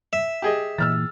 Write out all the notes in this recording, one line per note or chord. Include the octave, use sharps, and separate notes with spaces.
E5
G4 G#4 D#5
A#2 E3 E6 F6 A6